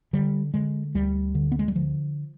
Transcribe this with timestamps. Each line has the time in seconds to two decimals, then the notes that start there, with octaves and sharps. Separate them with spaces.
0.13 D3 G3
0.54 D3 G#3
0.95 D2 G3
1.35 D3
1.52 B3
1.59 G#3
1.68 G3
1.76 D3 F3